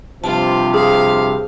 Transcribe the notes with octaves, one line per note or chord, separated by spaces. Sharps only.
G2 C3 F3 F4 A5
G#4 F5